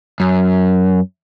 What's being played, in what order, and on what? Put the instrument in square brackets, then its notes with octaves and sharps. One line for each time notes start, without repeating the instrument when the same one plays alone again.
[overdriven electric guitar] F#2